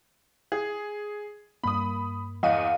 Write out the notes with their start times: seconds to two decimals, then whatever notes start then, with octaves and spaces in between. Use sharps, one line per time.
0.52 G#4
1.64 G2 A#3 B5 D#6
2.43 E2 D#5 F5 F#5 D#7